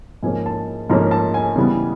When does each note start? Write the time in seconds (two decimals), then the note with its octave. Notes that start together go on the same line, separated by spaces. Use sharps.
0.23 G#2 F3 A#3 C#4 G#5
0.46 A5
0.90 G#2 F3 A#3 C#4 A#5
1.11 A5
1.34 G#5
1.56 C#3 E3 G3 B3